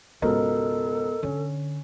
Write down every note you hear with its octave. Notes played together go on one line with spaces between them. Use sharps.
C#2 G#2 B2 B3 A4 A#4 D#5
D3 C#4